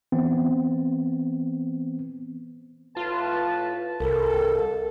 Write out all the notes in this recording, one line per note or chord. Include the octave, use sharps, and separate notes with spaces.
E3 B3 C4
A2 F4 B4 A5
C2 A4 A#4